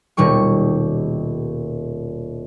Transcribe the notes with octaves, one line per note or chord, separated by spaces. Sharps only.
D#1 B2 D#3 G3 C#6